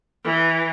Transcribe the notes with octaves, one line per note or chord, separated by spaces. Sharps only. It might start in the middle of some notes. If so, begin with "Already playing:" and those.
E3